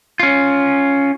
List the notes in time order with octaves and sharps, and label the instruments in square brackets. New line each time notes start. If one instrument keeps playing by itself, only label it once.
[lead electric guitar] C#4 F4